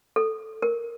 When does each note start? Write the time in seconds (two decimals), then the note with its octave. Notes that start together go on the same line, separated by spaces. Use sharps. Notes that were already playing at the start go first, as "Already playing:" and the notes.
0.16 A4
0.62 A#4